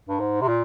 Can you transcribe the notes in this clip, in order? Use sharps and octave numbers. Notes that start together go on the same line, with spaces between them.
G2
G#2
C3
A#2